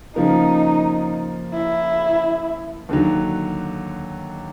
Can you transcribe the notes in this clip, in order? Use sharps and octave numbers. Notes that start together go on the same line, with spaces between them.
C#3 F3 A#3 D#4
E4
D#2 D3 F#3